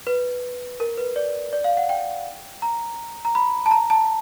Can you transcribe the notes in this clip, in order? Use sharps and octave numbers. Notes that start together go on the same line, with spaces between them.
B4
A#4
B4
D5
D5
F5
F#5
G5
A#5
A#5
B5
A5
A#5
A5